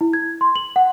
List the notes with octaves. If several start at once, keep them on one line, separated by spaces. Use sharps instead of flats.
E4
G#6
C6
F#7
F#5